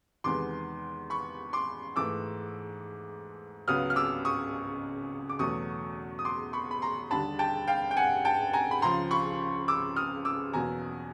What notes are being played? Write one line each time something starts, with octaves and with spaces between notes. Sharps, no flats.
E2 C3 D#3 G#3 B3 C6 D6
B5 C#6
C6 D6
G#2 E3 A3 D6 E6
C#2 C#3 F#3 B3 D#6 F6
F6
D6 E6
C#6 D#6
D6
E2 B2 F#3 A3 C#6 D#6
D#6
C6 D6
B5 C#6
B5
A#5 C6
D#2 D3 G3 A5 B5
G5 A5
F5 G5
G5
F#5 G#5
G5 A5
G#5 A#5
B5
C#2 C#3 F3 A#5 C6
B5 C#6
D6 E6
D#6 F6
D6 E6
E2 B2 F#3 A#3 G#5 A#5